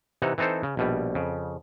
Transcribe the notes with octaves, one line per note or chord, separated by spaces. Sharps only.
C3 E3 D#4 F#5
E3 C4 D#4 A4 C5
C#3
A#1 B2 G3
F2 C#3